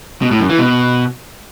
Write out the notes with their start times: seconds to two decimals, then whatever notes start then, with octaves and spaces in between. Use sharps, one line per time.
0.22 B2
0.31 A2
0.40 F#2
0.49 E3
0.59 B2